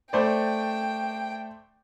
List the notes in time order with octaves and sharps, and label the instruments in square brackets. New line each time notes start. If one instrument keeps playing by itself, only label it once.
[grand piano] A3 C5 D5 [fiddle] G5